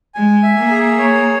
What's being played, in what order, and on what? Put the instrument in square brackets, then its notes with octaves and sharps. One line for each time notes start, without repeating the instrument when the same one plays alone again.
[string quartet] G#3 [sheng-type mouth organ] G#5
[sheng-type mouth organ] E5
[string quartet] A#3
[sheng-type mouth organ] G#4
C#5